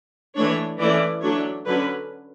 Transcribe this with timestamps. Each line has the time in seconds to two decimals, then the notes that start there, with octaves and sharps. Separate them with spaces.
0.35 E3 A3 D4 C#5
0.78 E3 A3 C#4 D5
1.21 F#3 A3 D4 C#5
1.65 D3 F#3 C#4 B4